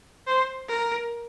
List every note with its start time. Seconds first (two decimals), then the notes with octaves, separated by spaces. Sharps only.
0.27 C5
0.69 A#4